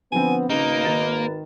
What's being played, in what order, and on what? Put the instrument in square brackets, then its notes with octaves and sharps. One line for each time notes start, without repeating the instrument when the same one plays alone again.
[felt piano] D3 F3 C4 [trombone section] B3 [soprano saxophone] G#5
[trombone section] G#1 A#4 B4 [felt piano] C#3 [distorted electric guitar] A#3 [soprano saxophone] D#4
[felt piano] D#3 A6 E7